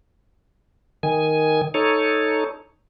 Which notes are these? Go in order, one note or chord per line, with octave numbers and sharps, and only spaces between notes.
D#3 G#5
D#4 A4 C#5